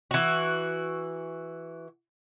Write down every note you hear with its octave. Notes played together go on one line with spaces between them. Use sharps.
E3 F#4